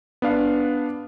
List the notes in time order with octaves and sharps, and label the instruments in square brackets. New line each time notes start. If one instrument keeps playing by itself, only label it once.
[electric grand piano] B3 D4 F5